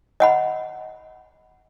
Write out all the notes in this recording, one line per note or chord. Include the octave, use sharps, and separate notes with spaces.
D#5 F#5 B5